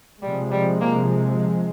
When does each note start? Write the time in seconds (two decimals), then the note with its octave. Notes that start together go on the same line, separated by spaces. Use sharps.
0.22 C3 F3 G3 G#3
0.52 G3
0.81 A#3